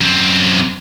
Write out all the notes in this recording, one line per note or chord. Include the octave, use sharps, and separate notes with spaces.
F#2 C4